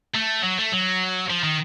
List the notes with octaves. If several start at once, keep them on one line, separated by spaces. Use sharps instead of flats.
A3
F#3
A3
F#3
F3
D#3